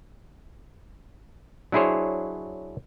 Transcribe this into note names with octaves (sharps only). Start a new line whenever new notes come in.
F#3 D4 E4 G#4 C5 C#5